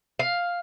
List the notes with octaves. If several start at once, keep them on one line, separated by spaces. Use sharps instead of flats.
F5